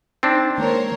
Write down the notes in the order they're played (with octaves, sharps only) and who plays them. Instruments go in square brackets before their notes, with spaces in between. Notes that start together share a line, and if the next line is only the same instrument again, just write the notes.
[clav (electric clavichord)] C4 D4 [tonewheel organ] D#4 G5 A6
[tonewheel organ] D#3 G#3 A#3 [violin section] A#4 C5 C#5